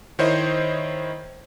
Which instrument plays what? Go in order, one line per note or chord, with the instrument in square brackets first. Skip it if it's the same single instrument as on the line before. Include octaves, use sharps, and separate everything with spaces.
[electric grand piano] D#3 E4 C5 C#5 D#5